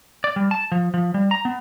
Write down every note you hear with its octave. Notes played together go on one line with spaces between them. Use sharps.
D5
G3
A5
F3
F3
G3
A#5
B3